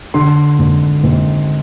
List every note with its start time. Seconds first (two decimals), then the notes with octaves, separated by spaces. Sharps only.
0.14 D3 C6
0.59 G#1
1.04 G#1